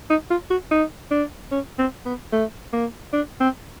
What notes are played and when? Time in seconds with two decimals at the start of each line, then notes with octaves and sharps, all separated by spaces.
0.10 D#4
0.30 F4
0.50 F#4
0.71 D#4
1.11 D4
1.51 C#4
1.79 C4
2.06 B3
2.32 A3
2.73 A#3
3.13 D4
3.40 C4